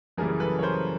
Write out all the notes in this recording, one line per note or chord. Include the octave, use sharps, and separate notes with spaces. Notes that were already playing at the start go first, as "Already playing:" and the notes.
F#2 C#3 E3 G3 A#3 G#4 A#4
A4 B4
C#5
A#4 C5